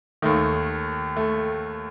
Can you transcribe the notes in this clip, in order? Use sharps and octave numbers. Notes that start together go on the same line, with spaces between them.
D#2 D#3 A3
A3